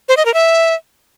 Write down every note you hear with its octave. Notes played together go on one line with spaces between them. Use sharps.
C5
D#5
A#4
E5